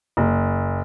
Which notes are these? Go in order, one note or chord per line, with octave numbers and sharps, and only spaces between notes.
F#1